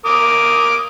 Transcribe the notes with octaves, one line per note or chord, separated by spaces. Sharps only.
A#4 D6 D#6